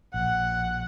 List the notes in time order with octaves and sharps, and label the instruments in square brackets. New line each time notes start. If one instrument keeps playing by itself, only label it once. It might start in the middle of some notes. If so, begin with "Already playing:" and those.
[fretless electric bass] A#1 [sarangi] F#5